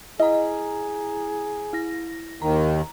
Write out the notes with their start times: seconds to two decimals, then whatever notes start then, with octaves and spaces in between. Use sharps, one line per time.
0.20 E4 G#4 D#5 A#5
1.73 E4 A#6
2.42 D#2 D#3 A#5